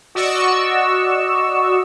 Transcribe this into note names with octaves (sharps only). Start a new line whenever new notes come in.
F#4 D5 D#5 C#6 E6